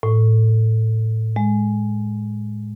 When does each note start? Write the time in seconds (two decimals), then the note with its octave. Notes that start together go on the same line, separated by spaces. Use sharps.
0.03 A2
1.36 G#3